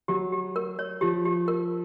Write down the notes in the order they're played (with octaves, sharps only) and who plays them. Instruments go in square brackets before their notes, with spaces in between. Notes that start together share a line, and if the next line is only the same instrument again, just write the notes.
[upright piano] F#3 [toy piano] G4
[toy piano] G4
A#4
C#5
[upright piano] F3 [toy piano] G4
[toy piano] G4
A#4